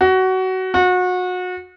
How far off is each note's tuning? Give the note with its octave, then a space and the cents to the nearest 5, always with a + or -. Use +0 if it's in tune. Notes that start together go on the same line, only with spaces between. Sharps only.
F#4 +20
F#4 -30